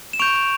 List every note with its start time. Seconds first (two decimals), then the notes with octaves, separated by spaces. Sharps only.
0.13 E7
0.19 C#6 G6 D7 F7